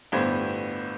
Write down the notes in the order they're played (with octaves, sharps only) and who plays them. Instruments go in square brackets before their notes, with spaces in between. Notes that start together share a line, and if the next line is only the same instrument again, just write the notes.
[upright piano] G1 A2 B3 G4 C5 G#6